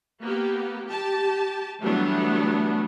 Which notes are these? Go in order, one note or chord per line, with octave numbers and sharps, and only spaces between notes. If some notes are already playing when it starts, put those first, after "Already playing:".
A#3 B3 G4
G4 A5
E3 F#3 G3 A3 B3 D4